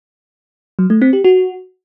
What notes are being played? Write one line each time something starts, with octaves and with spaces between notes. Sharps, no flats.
F#3
A3
C4
G4
F#4